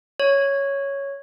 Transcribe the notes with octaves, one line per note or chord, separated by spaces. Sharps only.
C#5